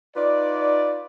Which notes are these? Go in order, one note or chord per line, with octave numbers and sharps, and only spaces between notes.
D#4 F4 B4 D5